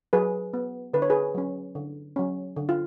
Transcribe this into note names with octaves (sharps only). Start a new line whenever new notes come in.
F#3 G#4 B4
B3
D3 B4
C#5
G#4 B4
F#3 C#4
D3
F#3 C#4
D3
F4